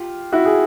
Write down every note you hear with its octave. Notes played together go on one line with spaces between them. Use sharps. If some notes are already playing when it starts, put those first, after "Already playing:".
Already playing: F4 G4
E4 F#4
G#4